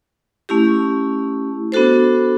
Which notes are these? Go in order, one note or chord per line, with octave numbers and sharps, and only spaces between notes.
A3 C#4 E4 G4
B3 D4 F#4 A4 C5